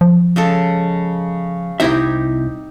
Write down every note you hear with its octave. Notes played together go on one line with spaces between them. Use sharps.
F3
C#3 G#3 A4
C2 C4 D#4 E4 G4 E5